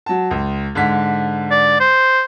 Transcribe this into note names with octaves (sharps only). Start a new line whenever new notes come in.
F#3 A5
C#2
G#2 D3 B6
D5
C5